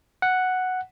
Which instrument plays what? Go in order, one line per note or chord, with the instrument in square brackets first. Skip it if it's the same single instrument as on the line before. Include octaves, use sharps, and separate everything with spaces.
[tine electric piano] F#5